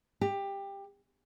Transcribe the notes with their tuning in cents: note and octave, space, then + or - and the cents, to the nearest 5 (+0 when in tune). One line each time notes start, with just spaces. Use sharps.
G4 +15